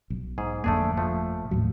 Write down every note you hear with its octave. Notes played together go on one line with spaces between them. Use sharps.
B1
G#2 G#4
G1 F2 A3 A#3 D4 G#4
F3 A3
D#2 A2 F#3